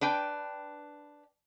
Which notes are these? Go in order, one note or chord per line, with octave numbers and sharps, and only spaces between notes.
D4 B4 G5